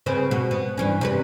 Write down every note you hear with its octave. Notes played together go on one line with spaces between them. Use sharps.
C#3 C4 B4
B2
B3
G2 E3 C#4
C3 C#4 B4